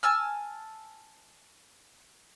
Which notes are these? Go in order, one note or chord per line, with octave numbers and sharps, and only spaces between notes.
G#5 A5 E6 F6